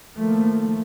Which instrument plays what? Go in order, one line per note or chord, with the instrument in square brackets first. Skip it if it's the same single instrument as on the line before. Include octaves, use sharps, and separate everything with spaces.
[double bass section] D#3 F3 A3 A#3